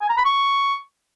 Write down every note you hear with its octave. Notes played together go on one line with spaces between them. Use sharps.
G#5
A#5
B5
C#6